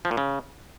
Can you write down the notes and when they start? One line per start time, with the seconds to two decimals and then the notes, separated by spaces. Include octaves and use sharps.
0.05 F3
0.11 A#2
0.17 C#3